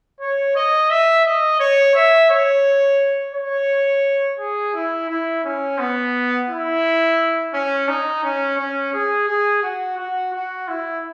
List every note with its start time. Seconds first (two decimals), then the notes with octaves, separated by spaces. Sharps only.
0.21 C#5
0.56 D#5
0.90 E5
1.25 D#5
1.60 C#5
1.95 E5
2.30 C#5
3.34 C#5
4.39 G#4
4.74 E4
5.09 E4
5.45 C#4
5.79 B3
6.49 E4
7.54 C#4
7.88 D#4
8.24 C#4
8.58 C#4
8.93 G#4
9.28 G#4
9.63 F#4
9.98 F#4
10.33 F#4
10.68 E4